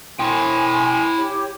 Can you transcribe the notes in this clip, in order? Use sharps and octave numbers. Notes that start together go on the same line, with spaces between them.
E4 G5 G#5 C6
G4 C#5